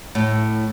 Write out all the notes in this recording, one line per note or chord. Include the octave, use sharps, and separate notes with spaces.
A2